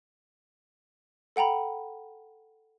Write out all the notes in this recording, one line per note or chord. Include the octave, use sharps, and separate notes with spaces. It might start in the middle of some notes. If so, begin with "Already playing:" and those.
A4 F#5 G5 A#5 B5